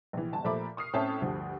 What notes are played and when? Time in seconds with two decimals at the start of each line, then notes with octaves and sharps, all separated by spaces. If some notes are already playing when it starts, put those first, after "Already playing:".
0.13 A#1 E3
0.33 G1 A5
0.44 A#2 F3 A3 E5 B5 D6
0.77 C#6 D#6 F6 C7
0.93 A2 C4 C#4 E5 A5 G6
1.22 D2 G2 F3